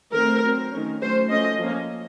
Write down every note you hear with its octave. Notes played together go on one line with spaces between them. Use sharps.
D#3 A3 C4 A#4
F#3 C4
D#3 A3 C#4
F#3 A3 C#4 C5
F3 A3 C#4 D#5
F3 A#3 C#4